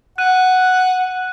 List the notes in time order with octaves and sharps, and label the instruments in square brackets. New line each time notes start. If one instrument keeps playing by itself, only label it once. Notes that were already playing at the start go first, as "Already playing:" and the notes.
[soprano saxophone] F#5 [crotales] F#6 D#7